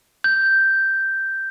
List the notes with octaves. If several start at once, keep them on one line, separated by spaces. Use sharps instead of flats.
G6